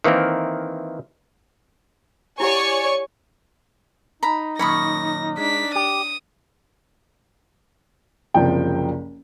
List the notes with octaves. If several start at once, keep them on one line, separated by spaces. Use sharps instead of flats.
D#3 E3 A#3 C4 A#4
E4 G4 C#5 D5 F#5 G#5 C#6
D#4 A#5 B5
F#2 A#2 D#3 C#5 B5 C#6 A#6
G#3 D4 B6
G4 D#6
F#1 C2 F3 G5